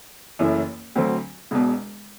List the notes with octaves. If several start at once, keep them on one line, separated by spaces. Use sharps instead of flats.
F#1 F#2 E3 A3 E4
D2 D3 F#3 C4
E1 E2 B2